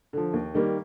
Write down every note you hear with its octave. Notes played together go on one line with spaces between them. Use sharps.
D3 F3
D#2
D#3 G3 A#3